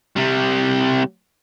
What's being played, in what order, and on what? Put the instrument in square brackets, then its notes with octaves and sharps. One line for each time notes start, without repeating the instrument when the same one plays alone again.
[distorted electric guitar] C3 G3